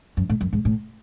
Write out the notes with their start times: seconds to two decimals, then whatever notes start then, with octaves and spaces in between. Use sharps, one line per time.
0.17 F#2
0.29 A2
0.41 F#2
0.53 G#2
0.65 A2